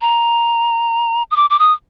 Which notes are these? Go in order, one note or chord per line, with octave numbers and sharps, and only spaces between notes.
A#5
D#6
D6
D6
D#6